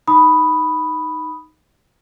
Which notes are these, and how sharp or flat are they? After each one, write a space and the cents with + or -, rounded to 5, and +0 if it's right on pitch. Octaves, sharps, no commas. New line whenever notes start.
D#4 +0 B5 +0 D#6 +0